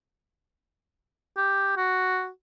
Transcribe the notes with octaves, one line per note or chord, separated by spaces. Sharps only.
G4
F#4